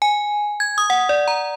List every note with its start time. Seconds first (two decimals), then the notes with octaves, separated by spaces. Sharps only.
0.02 G#5
0.60 G#6
0.78 D#6
0.90 F#5
1.09 D5
1.28 A#5